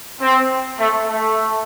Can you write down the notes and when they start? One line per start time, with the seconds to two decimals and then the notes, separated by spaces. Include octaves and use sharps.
0.21 C4
0.79 A3
1.07 A3